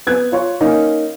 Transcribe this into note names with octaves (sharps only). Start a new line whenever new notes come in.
B3 F#6 G#6
F4 C#5 C#6
A#3 C#4 D#4